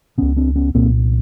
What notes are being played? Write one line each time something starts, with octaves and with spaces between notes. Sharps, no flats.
C#2 B2 B3 C#4
C4 D4
B3 C#4
C2 A#2 A#3 C4